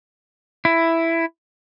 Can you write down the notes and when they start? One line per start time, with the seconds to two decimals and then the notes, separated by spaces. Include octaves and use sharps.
0.65 E4